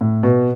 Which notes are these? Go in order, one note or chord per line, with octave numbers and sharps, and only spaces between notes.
A2
B2